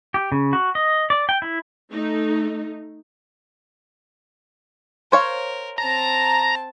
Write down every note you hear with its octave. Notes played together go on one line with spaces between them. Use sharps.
G4
C#3
F#4
D#5
D5
G5
E4
A3 D#4
A#4 C5 C#5 F5
C4 A5 A#5